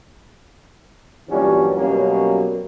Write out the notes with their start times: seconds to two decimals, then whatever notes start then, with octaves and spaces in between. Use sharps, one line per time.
1.29 G2 A#2 E3 F#3 G3 C#4
1.75 F#2 B2 F#3 G3 A#3 C#4